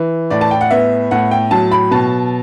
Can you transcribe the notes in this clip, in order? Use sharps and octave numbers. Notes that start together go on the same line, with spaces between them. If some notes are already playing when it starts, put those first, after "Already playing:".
Already playing: E3
A2 D5
A5
G5
F#5
B3 E5
A2 F#5
G5
F#3 A5
B5
B2 A5